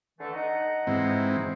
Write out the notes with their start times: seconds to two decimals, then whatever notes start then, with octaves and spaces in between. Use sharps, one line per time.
0.19 D3 E3 A3
0.33 D#4 F#5 A#5
0.87 G#2 E3 C4